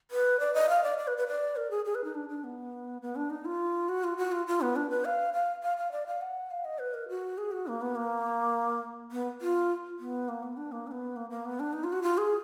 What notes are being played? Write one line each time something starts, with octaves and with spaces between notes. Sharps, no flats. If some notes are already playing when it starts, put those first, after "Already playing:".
B4
D5
D#5
F5
D5
D5
B4
B4
D5
A#4
G#4
G#4
B4
D#4
D4
D4
B3
B3
D4
D#4
F4
F#4
F4
F#4
F4
F4
B3
D4
B4
F5
F5
F5
F5
D5
F5
F#5
F5
D#5
B4
A#4
F#4
G#4
F#4
A#3
B3
A#3
B3
F4
B3
A#3
B3
D4
A#3
D4
B3
A#3
A#3
B3
D4
D#4
F4
F#4
F4
G#4